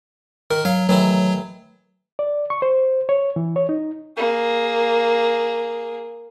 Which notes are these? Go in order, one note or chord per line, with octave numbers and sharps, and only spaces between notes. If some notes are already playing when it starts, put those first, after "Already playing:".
D#3 A#4
F#3 F5
A1 D#3 F#3 E4
D5
C#6
C5
C#5
E3
C#5
D#4
A#3 G#4